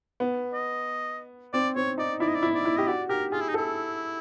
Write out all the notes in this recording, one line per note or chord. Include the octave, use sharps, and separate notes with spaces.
B3
D#5
C4 D5
C4 C#5
D#4 D5
E4 D5
D#5
D5
E4
D5
E4
G4 D#5
F#4 D5
G4 A#4
F4 G#4
E4
D#4
E4 A4